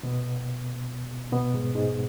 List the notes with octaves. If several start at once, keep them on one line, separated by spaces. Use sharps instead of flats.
B2 B3
B2 B3
G#2 G#3
G#2 G#3